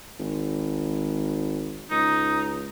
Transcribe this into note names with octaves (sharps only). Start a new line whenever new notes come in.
G#1
C#2 D#4